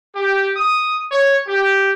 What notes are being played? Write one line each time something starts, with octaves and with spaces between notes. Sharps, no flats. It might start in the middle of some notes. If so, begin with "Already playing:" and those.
G4
D#6
C#5
G4